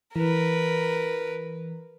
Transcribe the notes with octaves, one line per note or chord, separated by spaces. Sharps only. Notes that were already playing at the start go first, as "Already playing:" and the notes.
E3 A#4 B4